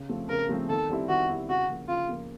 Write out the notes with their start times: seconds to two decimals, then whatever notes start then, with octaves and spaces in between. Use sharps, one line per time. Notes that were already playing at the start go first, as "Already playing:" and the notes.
Already playing: C#3
0.09 F3 A3 C4
0.29 C#3 A#4
0.49 F3 A3 C4
0.69 D#3 A4
0.89 G3 C4 E4
1.09 D#3 F#4
1.29 G3 C4 E4
1.49 C#3 F#4
1.69 F3 A#3
1.88 C#3 F4
2.09 F3 A#3